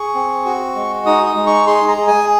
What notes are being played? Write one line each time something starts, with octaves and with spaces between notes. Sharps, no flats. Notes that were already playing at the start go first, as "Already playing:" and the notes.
Already playing: G#4 C#6
C4
F#4
G#3
D#4 D#6
D#6
G#3
C#6
G#4 C6
A#5
G#4
G#5